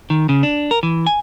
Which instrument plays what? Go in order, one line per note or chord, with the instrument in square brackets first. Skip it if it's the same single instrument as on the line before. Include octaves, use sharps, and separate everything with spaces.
[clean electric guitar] D#3
C#3
D4
A#4
E3
G#5